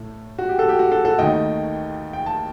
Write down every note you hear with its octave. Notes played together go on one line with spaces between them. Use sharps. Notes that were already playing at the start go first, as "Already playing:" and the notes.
Already playing: A2 A3
F#4
G4
F#4 A4
G4
F#4
F#4 A4
F#4 A4
D#2 D#3 A3 D#5 G5
G5
A5